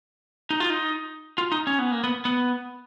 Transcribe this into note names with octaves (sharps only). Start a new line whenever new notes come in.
D#4
F4
D#4
F4
D#4
C#4
B3
A#3
B3
B3